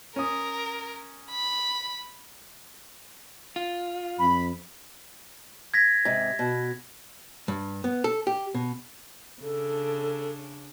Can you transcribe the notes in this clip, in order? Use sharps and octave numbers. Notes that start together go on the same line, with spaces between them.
C#4 A#4 D#6
B5
F4
F2 B5
G#6 A#6 B6
G#2 C3
B2
G2
B3
A4
G4
B2
C#3 D4 A4